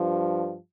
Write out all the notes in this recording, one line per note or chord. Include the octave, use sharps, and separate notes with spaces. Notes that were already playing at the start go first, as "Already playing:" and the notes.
Already playing: G2 F3